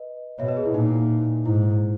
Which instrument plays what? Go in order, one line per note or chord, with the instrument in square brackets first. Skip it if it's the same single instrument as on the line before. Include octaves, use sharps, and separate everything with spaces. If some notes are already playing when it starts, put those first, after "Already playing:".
Already playing: [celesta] B4 D#5
[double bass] B2 [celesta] C#5 E5
[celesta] B4 D#5
G#4
E4
[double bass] A#2 [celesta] D#4
[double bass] G#2 [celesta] E4